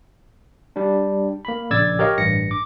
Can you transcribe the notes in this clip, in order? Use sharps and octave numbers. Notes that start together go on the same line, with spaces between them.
G3 D4
A#3 B5
A#1 C#3 D5 E6 G#6 A6
G4 A#4 C#5 D#5 F5
A1 G2 A#6 C#7
D6